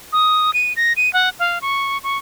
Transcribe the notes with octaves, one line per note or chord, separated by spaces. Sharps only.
D#6
D#7
A#6
D#7
F#5
F5
C#6
C#6